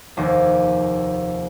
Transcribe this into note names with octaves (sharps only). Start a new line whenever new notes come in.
F1 D#2